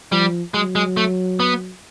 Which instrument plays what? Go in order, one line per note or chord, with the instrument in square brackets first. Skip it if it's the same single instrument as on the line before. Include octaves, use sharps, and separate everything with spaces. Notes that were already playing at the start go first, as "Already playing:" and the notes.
[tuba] F3 [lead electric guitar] G3
[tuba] F#3 [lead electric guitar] G#3
[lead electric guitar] G#3
A3
B3